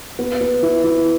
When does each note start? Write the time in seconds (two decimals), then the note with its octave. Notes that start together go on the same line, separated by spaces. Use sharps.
0.19 B3
0.41 B3
0.63 E4
0.84 E4